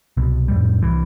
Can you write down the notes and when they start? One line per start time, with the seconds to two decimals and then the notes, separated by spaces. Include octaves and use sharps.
0.17 C2 B2
0.48 D#1 F2 A2 G3
0.81 C2 E3